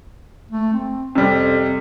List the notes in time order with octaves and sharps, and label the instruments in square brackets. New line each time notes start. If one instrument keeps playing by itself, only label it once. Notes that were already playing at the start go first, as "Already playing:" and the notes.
[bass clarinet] A3
C4
[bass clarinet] F2 [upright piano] C3 G3